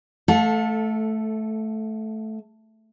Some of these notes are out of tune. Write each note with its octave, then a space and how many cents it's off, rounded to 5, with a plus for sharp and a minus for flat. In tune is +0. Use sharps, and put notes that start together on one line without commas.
A3 -10 A4 +5 F5 +40